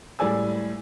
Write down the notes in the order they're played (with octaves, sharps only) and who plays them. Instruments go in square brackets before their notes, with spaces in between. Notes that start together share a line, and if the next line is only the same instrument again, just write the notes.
[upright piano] A2 G3 G#3 D5 G#5 E6